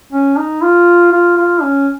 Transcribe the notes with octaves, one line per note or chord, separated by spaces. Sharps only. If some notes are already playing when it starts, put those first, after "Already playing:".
C#4
D#4
F4
F4
F4
C#4